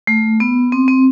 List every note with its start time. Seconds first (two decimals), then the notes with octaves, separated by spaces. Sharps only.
0.07 A3
0.40 B3
0.72 C4
0.88 C4